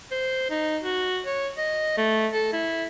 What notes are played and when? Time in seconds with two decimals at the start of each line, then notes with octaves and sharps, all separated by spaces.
0.12 C5
0.50 D#4
0.83 F#4
1.25 C#5
1.58 D#5
1.97 A3
2.33 A4
2.53 E4